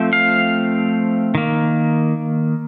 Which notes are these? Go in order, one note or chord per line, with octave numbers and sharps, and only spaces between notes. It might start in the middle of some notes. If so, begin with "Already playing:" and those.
Already playing: F3 A3 C4
F5
D#3 A#3